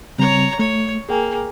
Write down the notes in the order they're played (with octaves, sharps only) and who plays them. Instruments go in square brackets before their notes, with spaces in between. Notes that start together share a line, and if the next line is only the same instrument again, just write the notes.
[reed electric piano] C#3 G3 C4 [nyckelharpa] C#5 A#5
[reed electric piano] A3 [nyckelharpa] C#5
[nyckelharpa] A#3 [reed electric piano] G#4 G5 G#5